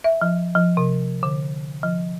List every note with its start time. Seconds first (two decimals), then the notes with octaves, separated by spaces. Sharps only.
0.04 E5
0.21 F3
0.55 F3
0.77 C3
1.23 D3
1.83 F3